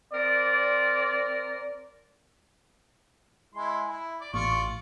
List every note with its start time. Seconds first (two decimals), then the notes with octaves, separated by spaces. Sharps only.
0.13 C4 A#4 D5
3.54 G#3 E4 C6
3.87 E4
4.21 D5
4.34 A1 F4 D5 C#6